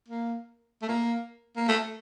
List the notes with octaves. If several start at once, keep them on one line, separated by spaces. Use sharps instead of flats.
A#3
A3
A#3
A#3
A3